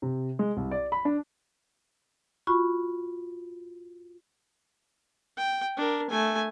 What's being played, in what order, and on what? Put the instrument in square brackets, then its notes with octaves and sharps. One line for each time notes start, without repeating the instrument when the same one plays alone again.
[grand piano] C3
G#3
C2
D5
B5
D4
[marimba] F4 F#4 B5 C#6
[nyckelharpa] G5
D4 A#4
A3 G#5